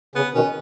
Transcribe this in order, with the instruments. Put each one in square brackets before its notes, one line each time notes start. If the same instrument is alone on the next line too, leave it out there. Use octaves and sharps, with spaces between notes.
[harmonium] C#3 [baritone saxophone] B3
[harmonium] B2 D#3 [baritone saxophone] C#4